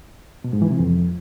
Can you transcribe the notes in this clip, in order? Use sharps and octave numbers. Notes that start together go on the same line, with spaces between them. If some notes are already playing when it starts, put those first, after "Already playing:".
B2
G#2
E3
C3
F2